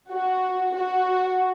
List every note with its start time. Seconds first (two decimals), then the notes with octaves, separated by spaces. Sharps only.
0.12 F#4
0.75 F#4